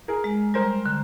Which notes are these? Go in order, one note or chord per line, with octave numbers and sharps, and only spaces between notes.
G#4 A#4
G#3
G3 A#4 C5
D3